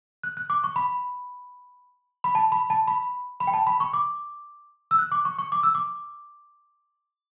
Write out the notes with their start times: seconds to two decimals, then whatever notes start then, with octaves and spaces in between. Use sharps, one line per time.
0.23 F#6
0.37 F#6
0.50 D6
0.64 C#6
0.76 B5
2.24 B5
2.35 A5
2.52 B5
2.70 A5
2.88 B5
3.40 B5
3.47 G5
3.54 A5
3.67 B5
3.80 C#6
3.93 D6
4.91 E6
4.99 F#6
5.12 D6
5.25 C#6
5.38 C#6
5.52 D6
5.63 E6
5.75 D6